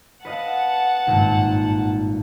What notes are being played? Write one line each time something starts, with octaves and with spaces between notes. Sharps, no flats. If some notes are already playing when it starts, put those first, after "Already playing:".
B4 D#5 F5 F#5 A5
G#1 G2 A#2